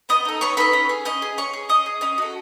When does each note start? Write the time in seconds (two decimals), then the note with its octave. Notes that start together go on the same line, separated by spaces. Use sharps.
0.09 B3 D#5 D#6
0.25 D#4 A4
0.41 B3 C#5 C#6
0.57 D#4 A4 B4 B5
0.73 C#4
0.89 G#4
1.05 C#4 D#5 D#6
1.22 G#4
1.38 C#4 C#5 C#6
1.53 G#4
1.69 C#4 D#5 D#6
1.86 G#4
2.01 C#4 D#5 D#6
2.18 F#4 A4